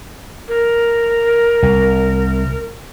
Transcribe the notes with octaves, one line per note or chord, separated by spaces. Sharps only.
A#4
C2